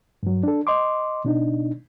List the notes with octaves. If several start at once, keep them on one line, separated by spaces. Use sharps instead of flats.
G2 F#3
D4 A4
D#5 C6 D6
B2 D4 D#4